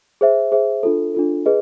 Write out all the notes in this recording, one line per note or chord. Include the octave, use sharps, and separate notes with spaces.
G#4 C5 E5
G#4 C5 E5
D4 F4 A4
D4 F4 A4
G#4 B4 D#5